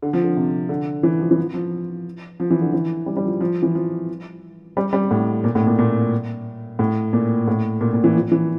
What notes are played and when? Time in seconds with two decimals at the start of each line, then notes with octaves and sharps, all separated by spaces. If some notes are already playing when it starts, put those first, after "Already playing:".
0.02 D3
0.13 F3
0.24 D3
0.36 C3
0.69 D3
1.03 E3
1.20 F3
1.31 E3
1.38 F3
1.54 F3
2.40 F3
2.50 E3
2.61 D3
2.73 E3
3.06 G3
3.17 G3
3.24 F3
3.40 F3
3.62 E3
3.75 F3
4.77 G3
4.93 G3
5.11 A2
5.44 A#2
5.55 A2
5.67 A#2
5.79 A#2
6.79 A2
7.13 A#2
7.47 A2
7.81 A#2
7.93 A#2
8.04 E3
8.15 F3
8.32 E3